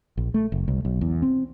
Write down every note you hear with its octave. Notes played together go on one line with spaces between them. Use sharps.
A#1
A3
F#1
C2
B1
E2
C4